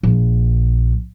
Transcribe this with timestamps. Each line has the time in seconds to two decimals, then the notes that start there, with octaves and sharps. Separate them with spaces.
0.03 A#1